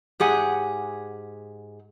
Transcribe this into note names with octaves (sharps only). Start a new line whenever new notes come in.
G#2 G4 G#4 F#5 G#5